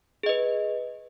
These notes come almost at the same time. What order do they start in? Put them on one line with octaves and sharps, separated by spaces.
G#4 D#5 B4